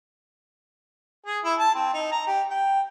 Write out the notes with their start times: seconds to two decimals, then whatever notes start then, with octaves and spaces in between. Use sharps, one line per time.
1.26 G#4
1.44 E4
1.59 A5
1.75 C4
1.94 D#4
2.12 A#5
2.27 G4
2.50 G5